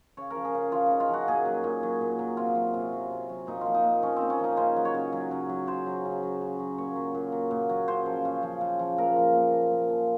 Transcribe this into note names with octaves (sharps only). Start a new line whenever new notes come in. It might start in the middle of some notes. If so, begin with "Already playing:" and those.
C#3 C#5
F3 A#4
G#4
C#3
F3 F4
C#3 D#4
F4
F3 F#4
A#2 G#4
F#3
A#2
F#3
A#2
F#3
C3 F4
F#3
C3
F#3
C3
F#3
A#2 D#4
F3 F4
D#4
A#2
F3 C#4
A#2 C4
C#4
F3 D#4
C#3 C5
F#3
C#5
C#3
F#3
C#3
F#3
C#3 C5
F#3
C#3
F#3
C#3
F#3
A#2 C#5
F#3
A#2
F#3
A#2
F#3
C#3 C5
F3
C#3
F3
C#3
F3
A#2 A#4
F3
A#2
F3
A#2
F3